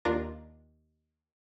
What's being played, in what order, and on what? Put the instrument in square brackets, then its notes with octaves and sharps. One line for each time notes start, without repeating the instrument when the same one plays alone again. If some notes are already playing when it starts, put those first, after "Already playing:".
[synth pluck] D#2 D4 F4 A#4 D6 A#6